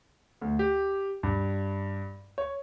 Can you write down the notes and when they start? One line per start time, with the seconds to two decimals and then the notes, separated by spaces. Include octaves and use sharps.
0.41 D2
0.59 G4
1.23 G2
2.38 C#5